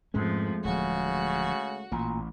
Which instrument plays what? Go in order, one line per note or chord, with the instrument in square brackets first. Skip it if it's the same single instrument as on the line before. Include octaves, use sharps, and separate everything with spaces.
[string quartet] F2 F3 [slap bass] G#2 C#4 [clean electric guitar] G#3 A3
[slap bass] D1 F3 [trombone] C#3 [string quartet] F#4
[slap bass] A1 [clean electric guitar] A#2